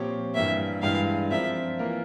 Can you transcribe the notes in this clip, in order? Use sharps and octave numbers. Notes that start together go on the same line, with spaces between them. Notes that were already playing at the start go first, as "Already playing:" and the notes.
Already playing: A#2 F3 C4 G4 C#5
G2 E3 A#3 E5
G2 E3 G#3 E4 F5
F3 C4 F4 A#4 E5
E3 A#3 F4 A#4